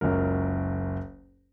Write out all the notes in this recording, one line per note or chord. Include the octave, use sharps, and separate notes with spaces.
F#1 C#2 F#3 A#4